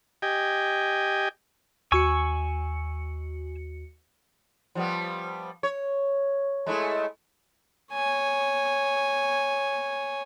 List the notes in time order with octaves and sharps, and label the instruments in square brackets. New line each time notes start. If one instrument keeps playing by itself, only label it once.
[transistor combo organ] G4 D#5 G5 G#5
[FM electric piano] D#2 F#4 C#7 [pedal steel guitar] G#5 C#6 E6
[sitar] F3 G3 B3
C#5
G#3 A3 E4
[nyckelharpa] C#5 G#5